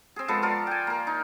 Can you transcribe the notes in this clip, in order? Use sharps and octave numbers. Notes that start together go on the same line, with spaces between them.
C4 G#4
F3 G#3 B3 A4
F4 A4 A#4 D5
G5 G#5
A#3 A#4
D#4